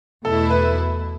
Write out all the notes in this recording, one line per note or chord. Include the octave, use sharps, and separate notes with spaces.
E2 B2 A3 E4 A4
B4